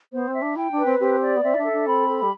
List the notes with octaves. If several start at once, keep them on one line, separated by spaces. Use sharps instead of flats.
B3 C5
C4
E5
D4
E4 G5
D4
B4
C4
C4 G4
D5
B3
C4 E5
E4
D4
A4
D4
C4 B5
A4
G3